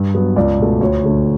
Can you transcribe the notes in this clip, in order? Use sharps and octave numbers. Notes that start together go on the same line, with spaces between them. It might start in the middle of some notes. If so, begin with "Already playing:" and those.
Already playing: G2
F#3 B3
C#2 D5
B2 A3
D2 C#5
D3 A3